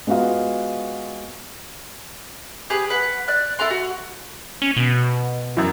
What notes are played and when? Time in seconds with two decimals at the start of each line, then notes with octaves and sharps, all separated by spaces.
0.07 G#3 B3 F4 F#4 F5
2.70 G4 G#4 B4 D#6
2.90 B4 F#5
3.28 D5 F#6
3.59 E4 A4 A#5 C6
3.70 F#4
4.62 C#4
4.76 B2
5.57 F#2 E3